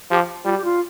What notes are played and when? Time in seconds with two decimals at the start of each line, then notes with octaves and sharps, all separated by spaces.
0.11 F3 G4
0.45 G3 F4
0.55 G4
0.64 F4